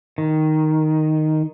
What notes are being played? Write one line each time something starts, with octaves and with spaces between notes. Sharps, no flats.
D#3